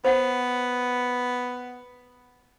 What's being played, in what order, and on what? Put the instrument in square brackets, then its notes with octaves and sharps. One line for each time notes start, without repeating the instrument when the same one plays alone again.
[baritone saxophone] B3 [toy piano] C5 F#5